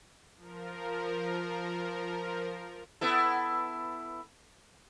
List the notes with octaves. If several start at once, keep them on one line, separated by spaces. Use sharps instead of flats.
F3 A#4
B3 E4 A4